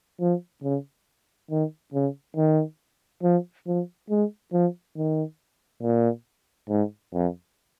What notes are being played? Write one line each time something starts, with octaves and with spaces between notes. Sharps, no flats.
F3
C#3
D#3
C#3
D#3
F3
F3
G#3
F3
D#3
A#2
G#2
F2